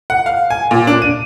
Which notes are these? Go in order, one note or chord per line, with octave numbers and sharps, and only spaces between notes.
F#5
F5
G#5
A#2
D4
D#7